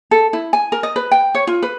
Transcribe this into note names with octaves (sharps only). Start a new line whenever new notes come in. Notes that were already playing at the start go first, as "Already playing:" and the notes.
A4
E4
G#5
A#4
D#5
B4
G5
C#5
F4
B4